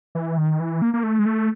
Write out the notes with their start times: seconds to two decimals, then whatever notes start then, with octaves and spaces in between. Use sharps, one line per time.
0.15 E3
0.38 D#3
0.60 E3
0.82 A#3
0.94 A#3
1.03 A3
1.19 G#3
1.26 A3